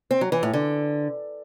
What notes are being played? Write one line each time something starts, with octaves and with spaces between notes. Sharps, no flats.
C4
F#3
E3
A2
D3